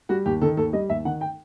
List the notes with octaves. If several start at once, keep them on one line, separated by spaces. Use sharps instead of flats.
G3 F#4
D#2 G4
D#3 A4
D#2 A4
G3 D#5
D#2 E5
D#3 F#5
G5